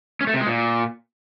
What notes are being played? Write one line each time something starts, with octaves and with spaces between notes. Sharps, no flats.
C#4
A3
C3
G#3
A#2